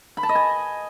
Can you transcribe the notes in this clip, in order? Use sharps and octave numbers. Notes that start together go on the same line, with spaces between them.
B5
A5
D#5
G#5